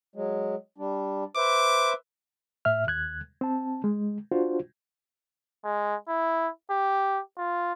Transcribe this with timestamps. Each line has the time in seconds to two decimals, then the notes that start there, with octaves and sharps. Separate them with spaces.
0.15 F#3 G#3
0.78 G3 D4
1.37 B4 C5 E5 D6
2.65 A2 E5 F6
2.87 D#2 F#6 G#6
3.41 C4 A5
3.84 G#3
4.31 D4 F4 F#4 C5
5.65 G#3
6.09 E4
6.71 G4
7.38 F4